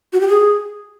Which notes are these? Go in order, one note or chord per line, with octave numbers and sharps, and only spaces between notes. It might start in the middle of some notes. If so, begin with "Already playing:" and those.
F#4
G4
G#4